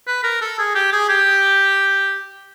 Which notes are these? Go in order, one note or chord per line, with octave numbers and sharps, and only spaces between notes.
B4
A#4
A4
G#4
G4
G#4
G4